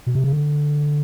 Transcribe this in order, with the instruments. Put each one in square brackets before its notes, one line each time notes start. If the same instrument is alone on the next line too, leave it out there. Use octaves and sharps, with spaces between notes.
[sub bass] B2
C3
C#3
D3